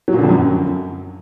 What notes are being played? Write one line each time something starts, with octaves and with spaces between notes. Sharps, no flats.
F#3
A#2
D3
F2
F#2